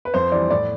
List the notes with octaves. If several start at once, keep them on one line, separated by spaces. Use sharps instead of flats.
B4
F2 C5
E3 G3 D5
A2 D5